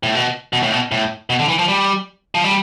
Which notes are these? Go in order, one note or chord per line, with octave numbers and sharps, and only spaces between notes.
A2
B2
B2
A2
B2
A2
B2
D3
E3
F3
G3
F3
G3